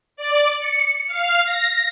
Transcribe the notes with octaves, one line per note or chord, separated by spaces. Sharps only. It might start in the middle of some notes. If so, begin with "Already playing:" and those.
D5
C#7
F5
A#6